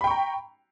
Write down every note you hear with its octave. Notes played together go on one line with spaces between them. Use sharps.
G5 A#5 B5 C#6